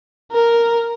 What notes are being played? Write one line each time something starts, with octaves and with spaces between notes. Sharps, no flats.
A#4